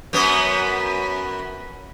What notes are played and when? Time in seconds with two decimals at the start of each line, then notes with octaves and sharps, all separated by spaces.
0.13 F#2 B3